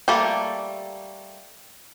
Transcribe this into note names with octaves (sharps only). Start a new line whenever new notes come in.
G3 A3 A#3 A4